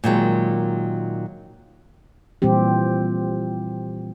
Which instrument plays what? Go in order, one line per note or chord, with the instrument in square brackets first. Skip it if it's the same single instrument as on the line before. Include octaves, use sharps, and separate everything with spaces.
[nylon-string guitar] A#2 D#3 F#3 G#3
[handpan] A#2 E3 G3 C4 G4